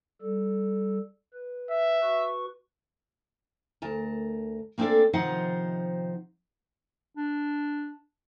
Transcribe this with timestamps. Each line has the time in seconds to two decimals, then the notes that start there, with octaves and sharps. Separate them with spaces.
0.22 G3 A4
1.33 B4
1.71 E5
2.02 F#4 B4 C#6
3.82 D2 A#4 A5
4.78 A#3 C4 D4 G#4 A4 D5
5.13 C3 D#3 F3 D#4 C5 F#5
7.17 D4